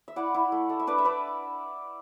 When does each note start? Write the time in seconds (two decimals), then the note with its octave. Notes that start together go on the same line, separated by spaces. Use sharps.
0.08 E5
0.16 E4 D5 F#5
0.34 E4
0.52 A3
0.69 A3
0.80 E5
0.87 D4 B4 D5
0.98 E5
1.05 D4 B4 D5